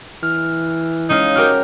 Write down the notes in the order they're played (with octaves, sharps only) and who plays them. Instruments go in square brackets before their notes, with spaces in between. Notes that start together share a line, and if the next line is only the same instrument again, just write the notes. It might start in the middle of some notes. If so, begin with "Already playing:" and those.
[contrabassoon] E3 [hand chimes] F6
[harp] G#3 C#4 F5 [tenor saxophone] D#4
[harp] F#4 G4 A#4 [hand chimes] F6